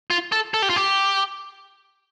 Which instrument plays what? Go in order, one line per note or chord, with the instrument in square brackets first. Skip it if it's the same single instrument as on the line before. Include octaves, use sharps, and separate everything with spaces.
[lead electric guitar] F4
A4
A4
G4
F4
G4